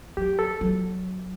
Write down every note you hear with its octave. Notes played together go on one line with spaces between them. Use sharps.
F#3 G4
A4
F#3